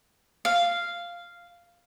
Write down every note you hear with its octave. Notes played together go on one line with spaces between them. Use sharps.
F5